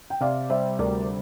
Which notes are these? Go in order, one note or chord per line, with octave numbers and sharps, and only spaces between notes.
G5
C3 D5 F5
G3 C5 E5
D2 A#4 D5